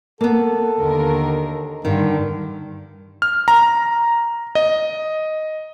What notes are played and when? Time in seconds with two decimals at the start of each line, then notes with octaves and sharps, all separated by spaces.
0.21 A#3 B3 A4
0.79 D#2 D3 A#4
1.85 G2 D3 D#3 G3
3.22 F6
3.48 A#5
4.55 D#5